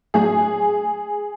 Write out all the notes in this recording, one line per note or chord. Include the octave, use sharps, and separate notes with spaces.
A2 F#3 A3 D4 F#4 G#4